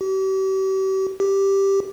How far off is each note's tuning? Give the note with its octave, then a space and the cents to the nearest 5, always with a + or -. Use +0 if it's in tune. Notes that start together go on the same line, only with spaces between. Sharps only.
G4 -40
G4 +0